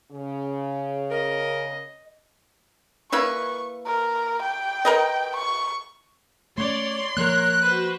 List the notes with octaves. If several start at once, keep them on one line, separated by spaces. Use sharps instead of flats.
C#3
A#4 D#5
A#3 E4 B4 C#6
A#4
G5
A#4 B4 D#5
C#6
A3 C#4 C#5 D5 C6
F3 A#3 A#4 C#5 F#6
F#4 B4 C5